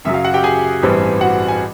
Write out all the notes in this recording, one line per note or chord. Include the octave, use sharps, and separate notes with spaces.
F#2 C#3 F#3 E5
F5
F#4 F#5
G4 G5
G#4 G#5
A1 G2 E3 G3 C4
F#4 F#5
G#5